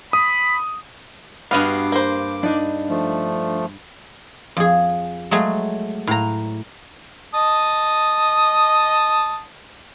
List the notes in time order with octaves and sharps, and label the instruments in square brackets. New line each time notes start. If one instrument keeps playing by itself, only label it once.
[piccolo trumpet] B5 [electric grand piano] D#6
[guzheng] G2 D#5 F5 [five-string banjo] B3 F#4 [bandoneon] D6
[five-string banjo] A#3 C5
[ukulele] D4 D#4
[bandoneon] F3 A3
[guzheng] F2 G#4
F#3 G#3 A3 G#4
A2 A#5
[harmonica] D#5 A5 D#6